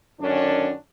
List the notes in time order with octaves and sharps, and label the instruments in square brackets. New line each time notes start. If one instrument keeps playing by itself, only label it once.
[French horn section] F#2 D3 D#3 C#4 D4